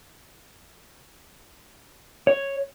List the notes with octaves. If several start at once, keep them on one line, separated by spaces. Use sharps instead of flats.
C#5